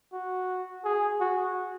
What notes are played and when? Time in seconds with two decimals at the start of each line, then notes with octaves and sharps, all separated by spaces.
0.13 F#4
0.85 G#4
1.21 F#4